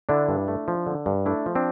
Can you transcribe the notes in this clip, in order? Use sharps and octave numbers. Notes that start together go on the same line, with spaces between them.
D3 D4 E4
G2
A3
F3
D3
G2
A3 D4 E4
F3
C4 D4